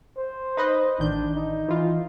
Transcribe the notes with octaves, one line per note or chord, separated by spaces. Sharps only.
C5
D#4 B4 D#5
A1 D#3 D4 G6
D#4
E3 F4